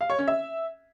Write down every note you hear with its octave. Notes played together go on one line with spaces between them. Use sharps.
F5
C#5
C#4
E5